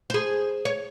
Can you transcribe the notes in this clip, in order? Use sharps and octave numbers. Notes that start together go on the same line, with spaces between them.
G#4 C5
C#5